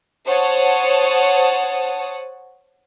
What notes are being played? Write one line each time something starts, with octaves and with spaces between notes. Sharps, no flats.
C5 C#5 F#5 A5 D#6